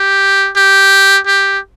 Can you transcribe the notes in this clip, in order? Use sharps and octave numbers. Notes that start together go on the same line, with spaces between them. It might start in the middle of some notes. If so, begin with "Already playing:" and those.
Already playing: G4
G4
G4